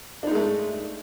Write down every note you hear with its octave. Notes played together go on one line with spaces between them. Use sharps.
G#3 A3 D4 D#4